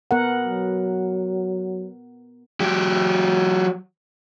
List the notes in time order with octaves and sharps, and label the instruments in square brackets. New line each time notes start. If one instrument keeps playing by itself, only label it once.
[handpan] B3 A#4 F#5
[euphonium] F#3
[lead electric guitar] F#3 G4